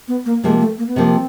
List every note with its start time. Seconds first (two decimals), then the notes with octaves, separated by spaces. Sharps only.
0.08 B3
0.26 A#3
0.44 C3 F3 G#3 A#3
0.61 A3
0.78 A#3
0.87 B3
0.96 C3 F3 A#3 C4